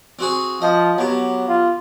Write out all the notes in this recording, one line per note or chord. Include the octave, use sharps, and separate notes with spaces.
C4 F#4 G#4
F3 D#5
F#3 B3 G4
F4